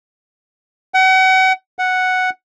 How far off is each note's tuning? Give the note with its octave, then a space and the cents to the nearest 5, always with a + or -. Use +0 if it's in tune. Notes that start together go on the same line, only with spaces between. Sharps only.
F#5 +35
F#5 +0